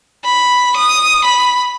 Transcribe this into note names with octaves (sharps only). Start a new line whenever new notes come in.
B5
D#6
B5